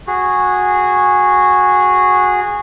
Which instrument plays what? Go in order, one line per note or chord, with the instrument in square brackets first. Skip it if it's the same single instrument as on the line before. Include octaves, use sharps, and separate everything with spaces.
[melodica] F#4 G#4